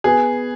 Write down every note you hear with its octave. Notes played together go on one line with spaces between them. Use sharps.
B3 G#4